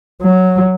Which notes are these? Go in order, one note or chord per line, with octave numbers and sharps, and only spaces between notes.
F#3